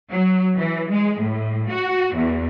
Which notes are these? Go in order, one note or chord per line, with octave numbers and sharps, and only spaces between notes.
F#3
E3
G#3
A2
F#4
E2